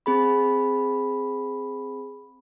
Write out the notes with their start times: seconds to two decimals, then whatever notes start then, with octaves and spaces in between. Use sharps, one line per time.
0.06 C4 G#4 B5